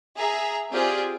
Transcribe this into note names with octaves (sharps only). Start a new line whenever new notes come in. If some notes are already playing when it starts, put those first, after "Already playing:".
G#4 E5 A#5
C4 F4 G4 G#4 D5